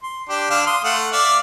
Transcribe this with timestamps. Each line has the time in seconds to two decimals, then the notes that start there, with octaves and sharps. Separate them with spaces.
0.03 C6
0.29 D4 G4
0.50 D3 D4 F5
0.66 C6 D#6
0.84 A3 F5 F#5
1.12 D5 E5 F5